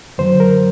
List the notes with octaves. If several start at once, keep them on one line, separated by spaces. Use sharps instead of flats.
F#2 D3 F#3 C5
A#4